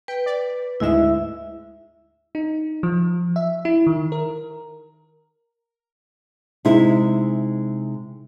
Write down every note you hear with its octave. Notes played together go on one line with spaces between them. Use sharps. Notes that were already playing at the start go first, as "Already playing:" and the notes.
B4 G5
D5
D2 G#2 G#3 E4 E5
D#4
F3
E5
E4
D#3
A#4
C3 G#3 D#4 E4 G#4